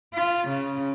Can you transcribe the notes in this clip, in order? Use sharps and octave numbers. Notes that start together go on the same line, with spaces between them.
F4
C#3